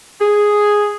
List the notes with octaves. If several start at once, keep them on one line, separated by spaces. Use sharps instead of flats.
G#4